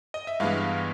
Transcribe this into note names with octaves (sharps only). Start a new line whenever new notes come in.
D#5
E5
G2 E3 G#3 B3 F5